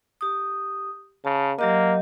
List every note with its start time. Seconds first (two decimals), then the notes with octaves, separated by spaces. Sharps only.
0.21 G4 D#6
1.25 C#3 A5
1.59 F#3 A#3 G4 D#5